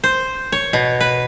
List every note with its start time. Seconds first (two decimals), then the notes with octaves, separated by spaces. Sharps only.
0.04 C5
0.52 C#5
0.73 B2
1.00 B4